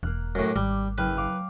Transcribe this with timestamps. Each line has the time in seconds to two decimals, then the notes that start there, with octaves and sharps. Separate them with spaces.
0.03 E1 A#3 F6 F#6
0.35 F#2 A2 D6 F#6
0.56 G#1 G3
0.98 F#1 B4 G5 F6
1.17 F5 D6